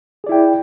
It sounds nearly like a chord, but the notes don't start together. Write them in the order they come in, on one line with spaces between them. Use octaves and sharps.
G#4 D5 E4 G5